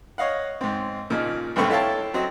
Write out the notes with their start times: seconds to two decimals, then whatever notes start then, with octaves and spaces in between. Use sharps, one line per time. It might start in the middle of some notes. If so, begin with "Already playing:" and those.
0.18 C#5 D#5 F5 F#5
0.61 G#2 C4
1.10 A#2 C#3 F3 D#4
1.56 B1 G2 D3 A3 C4 C#6
1.70 E4 A4 C#5 F5 G5 A5
2.14 F#3 C4 D#5